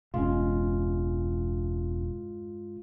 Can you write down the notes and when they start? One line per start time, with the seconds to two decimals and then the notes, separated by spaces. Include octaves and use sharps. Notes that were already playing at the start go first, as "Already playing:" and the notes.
0.14 E1 G2 G#3 C#4 F4